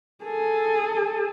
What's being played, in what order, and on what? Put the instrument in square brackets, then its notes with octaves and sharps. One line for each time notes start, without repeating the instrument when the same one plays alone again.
[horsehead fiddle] G#4 A4